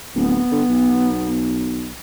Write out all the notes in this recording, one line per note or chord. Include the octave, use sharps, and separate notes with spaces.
D1 B3
D3
B1